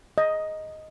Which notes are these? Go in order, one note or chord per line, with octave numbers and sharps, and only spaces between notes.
D#5